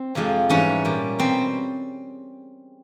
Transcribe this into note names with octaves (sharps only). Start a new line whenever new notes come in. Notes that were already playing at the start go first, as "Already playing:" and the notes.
Already playing: C4
F2 C3 F3 G#3
G#2 E3 G3 C#4
A#2 G3
B2 G3 C4